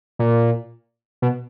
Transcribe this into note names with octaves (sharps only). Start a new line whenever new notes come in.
A#2
B2